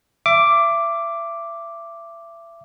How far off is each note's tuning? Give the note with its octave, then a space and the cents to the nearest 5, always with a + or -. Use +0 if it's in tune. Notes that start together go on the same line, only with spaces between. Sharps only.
E5 +30 D6 +0